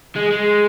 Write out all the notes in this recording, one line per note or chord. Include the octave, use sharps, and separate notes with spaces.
G#3
G#3